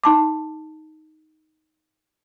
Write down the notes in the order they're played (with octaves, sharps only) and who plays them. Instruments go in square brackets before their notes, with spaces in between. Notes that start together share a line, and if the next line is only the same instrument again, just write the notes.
[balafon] D#4 A5 D6